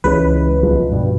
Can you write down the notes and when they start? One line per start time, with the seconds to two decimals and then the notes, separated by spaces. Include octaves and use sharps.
0.04 C#2 E3 G#3 C#4 B4
0.62 B1 F3 G#3
0.92 G2 B2